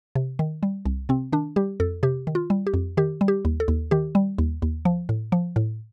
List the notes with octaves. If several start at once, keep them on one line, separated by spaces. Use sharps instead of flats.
C3
D#3
G3
C2
C3 C4
D#3 D4
G3 G4
F2 A4
C3 G4
D#3
F4
G3
G4
F2
D#3 G4
G3
G4
D#2
A4
D#2
D#3 G4
G3
D#2
D#2
F3
A2
F3
A2